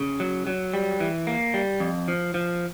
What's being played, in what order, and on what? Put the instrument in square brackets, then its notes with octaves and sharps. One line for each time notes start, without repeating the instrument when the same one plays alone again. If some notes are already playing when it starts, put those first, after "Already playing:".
Already playing: [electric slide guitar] C#3
F#3
F#3
G3
E3
A#3
G3
F2
F3
F3